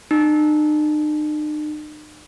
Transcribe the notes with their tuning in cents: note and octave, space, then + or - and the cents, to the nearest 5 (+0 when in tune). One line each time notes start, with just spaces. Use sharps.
D#4 -45